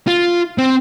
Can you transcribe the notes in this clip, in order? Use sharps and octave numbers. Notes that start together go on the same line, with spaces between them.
F4
C4